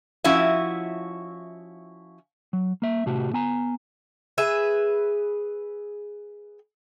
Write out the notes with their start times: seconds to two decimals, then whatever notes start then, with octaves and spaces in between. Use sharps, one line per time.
0.24 F3 C#4 E4 F#4 D#5 E5
2.53 F#3
2.82 A#3 E5
3.06 A2 C3 A3 F#4 G4
3.33 B3 G#5 A#5
4.38 G#4 B4 E5